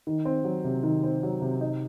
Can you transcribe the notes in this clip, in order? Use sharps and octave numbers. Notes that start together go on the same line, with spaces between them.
D#3
C4
F#3
C3
D#3
C4
F#3
C3
D#4